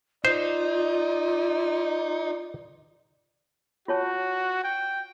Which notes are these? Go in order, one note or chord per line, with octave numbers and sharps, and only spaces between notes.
D#4 F4 C5 D5
F4 F#4 C#5 A5
G5